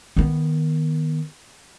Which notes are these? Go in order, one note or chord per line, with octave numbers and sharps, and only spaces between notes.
D#3 B3